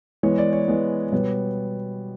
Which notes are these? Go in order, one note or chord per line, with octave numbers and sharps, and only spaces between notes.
E3 G#3 B3 C#5
D5
C#5
E3 G#3 B3
B2 G3 B3 C#5